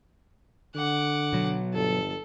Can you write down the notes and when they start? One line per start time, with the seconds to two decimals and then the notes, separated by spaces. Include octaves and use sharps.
0.75 D3 F#5 D6
1.33 B2 F#3
1.73 G1 A4